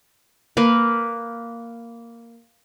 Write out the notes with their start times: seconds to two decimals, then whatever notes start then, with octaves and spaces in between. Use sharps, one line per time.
0.57 A#3 A#4 B4